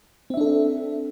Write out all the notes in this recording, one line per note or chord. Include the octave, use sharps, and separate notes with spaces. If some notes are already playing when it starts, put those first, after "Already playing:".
C4 D4 A4 E5